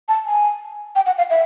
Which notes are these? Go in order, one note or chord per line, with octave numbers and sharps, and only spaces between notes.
A5
G#5
G5
F#5
F5
E5